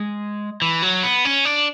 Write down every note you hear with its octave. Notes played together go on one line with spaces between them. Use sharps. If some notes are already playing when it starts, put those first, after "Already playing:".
Already playing: G#3
E3
F#3
B3
C#4
D4